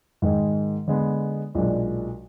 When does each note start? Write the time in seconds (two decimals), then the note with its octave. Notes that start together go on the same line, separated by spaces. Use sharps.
0.22 G#2 D#3 G#3 D#4
0.88 D3 G#3 B3
1.55 B1 A#2 G#3 D4